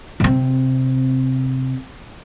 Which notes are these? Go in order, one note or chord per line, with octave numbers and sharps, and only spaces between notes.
C3 C4